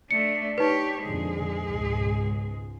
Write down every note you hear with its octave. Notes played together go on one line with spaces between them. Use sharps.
A3 D4 C#7
D#4 G4 B4 C#5
F2 A#2 D3 G#3 G#4
C#2 G#2 B2